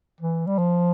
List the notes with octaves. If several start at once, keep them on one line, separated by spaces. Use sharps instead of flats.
E3
G3
F3